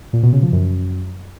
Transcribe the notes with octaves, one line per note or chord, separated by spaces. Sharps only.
A#2
B2
C#3
F3
F#2